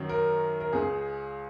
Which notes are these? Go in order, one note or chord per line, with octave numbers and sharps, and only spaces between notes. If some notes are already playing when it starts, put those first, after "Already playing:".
Already playing: F#2 D#3 F#3
A#4
A#4
C#2 C#3 G#3 G#4